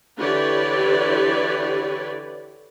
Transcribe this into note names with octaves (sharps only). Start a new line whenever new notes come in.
D3 E3 G4 B4 C#5 D5